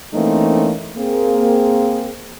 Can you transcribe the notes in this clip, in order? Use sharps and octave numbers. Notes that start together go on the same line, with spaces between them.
E3 A3 A#3 C4 C#4 D#4
A#3 C4 G#4